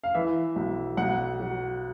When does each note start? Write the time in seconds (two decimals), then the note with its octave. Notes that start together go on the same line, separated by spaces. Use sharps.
0.04 F5
0.14 E3 E5
0.56 B1
0.97 B1 F#5
1.40 F#3